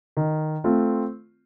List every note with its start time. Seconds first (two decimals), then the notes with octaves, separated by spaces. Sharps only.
0.17 D#3
0.64 A3 C4 F4